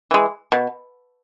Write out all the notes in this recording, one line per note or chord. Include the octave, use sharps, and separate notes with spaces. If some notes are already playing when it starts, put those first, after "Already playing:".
E3 G#3
B2